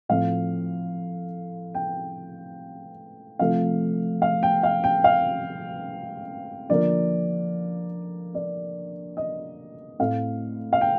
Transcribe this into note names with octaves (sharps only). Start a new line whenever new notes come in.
A2 F3 C4 F5
G5
C3 F3 A3 F5
F5
G5
F5
G5
F5
D3 F3 A#3 D5
D5
D#5
A2 A3 C4 F5
F5
G5